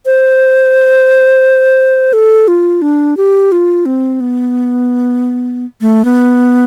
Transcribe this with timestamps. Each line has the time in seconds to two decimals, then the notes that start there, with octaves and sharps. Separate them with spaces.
0.05 C5
2.13 A4
2.48 F4
2.82 D4
3.17 G4
3.52 F4
3.86 C4
4.20 B3
5.81 A3
6.05 B3